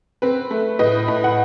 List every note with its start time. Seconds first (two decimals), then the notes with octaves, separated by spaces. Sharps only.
0.22 C4 B4
0.51 A3
0.79 A2 B4 D#5
1.08 A2
1.24 F#5